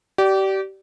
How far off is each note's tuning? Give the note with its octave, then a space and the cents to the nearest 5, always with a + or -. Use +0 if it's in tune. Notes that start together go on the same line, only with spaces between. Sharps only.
G4 -30 D5 +0